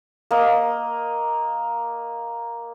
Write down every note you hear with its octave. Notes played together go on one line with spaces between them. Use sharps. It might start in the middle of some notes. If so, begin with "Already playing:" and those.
A#3 D#5